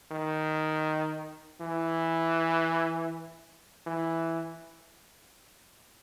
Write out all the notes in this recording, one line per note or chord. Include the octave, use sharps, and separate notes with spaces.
D#3
E3
E3